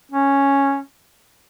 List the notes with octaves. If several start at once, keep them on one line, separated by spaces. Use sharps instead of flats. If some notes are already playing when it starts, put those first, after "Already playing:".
C#4